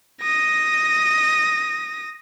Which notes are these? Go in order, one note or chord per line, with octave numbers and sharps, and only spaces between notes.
D#6 A#6